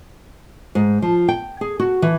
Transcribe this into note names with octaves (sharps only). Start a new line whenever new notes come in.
G#2
F3
G5
G#4
F#4
E3